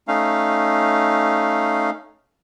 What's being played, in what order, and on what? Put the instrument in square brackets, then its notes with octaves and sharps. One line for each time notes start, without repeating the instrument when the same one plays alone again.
[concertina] A3 C#4 D#4 F5